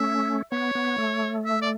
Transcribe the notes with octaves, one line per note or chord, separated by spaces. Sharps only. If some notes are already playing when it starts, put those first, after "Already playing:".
Already playing: A3 C#4 E5
B3 C#5
B3
A3
E5
D5